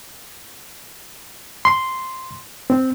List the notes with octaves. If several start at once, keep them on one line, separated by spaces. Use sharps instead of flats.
C6
C4